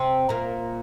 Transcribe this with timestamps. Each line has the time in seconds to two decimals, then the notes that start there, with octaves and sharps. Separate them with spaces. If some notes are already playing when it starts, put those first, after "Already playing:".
Already playing: C3 C4
0.29 A#2 A#3